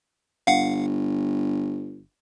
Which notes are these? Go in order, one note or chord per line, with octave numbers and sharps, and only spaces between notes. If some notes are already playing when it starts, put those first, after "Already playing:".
G1 F5 F#5